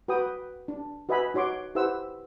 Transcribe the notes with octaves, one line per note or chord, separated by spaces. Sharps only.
F#4 B4 G5 D#6
D4
F#4 B4 D#5 E5 G#5 B5
D#4 F#4 C#5 C6 D6
E4 G4 B4 C5 F#5 E6